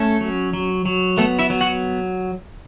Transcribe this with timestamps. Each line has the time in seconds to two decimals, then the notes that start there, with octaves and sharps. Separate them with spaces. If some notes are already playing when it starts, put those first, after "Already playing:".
Already playing: A3 C#4 A4
0.21 F#3
0.53 F#3
0.86 F#3
1.17 A3 B3 A4
1.39 E4 E5
1.50 F#3
1.61 F#4 F#5